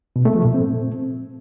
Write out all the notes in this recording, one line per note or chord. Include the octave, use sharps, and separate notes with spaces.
B2
A3
F3
A#2
C4